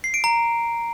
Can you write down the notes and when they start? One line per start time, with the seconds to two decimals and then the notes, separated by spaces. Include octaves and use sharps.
0.04 C7
0.14 D7
0.24 A#5